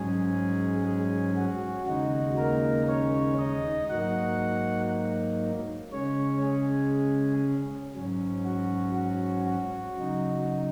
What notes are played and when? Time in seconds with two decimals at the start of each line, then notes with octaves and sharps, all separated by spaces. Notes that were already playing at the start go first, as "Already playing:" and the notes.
Already playing: G#2 F#3 G#3 C#4 G#4
0.85 G#3 G#4
1.37 F#4
1.87 D#2 C#3 G#3 D#4 F#4
2.38 A#3 A#4
2.88 C#4 C#5
3.39 D#4 D#5
3.89 G#2 F#3 A#3 D#4 F#4 F#5
5.92 C#3 G#3 C#4 C#5
6.43 G#3 G#4
7.95 G#2 F#3 C#4
8.45 F#4
8.96 F#4
9.47 F#4
9.97 C#3 F#3 D#4